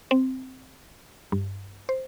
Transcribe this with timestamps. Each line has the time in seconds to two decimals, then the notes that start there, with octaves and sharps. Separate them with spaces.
0.11 C4
1.32 G2
1.89 C5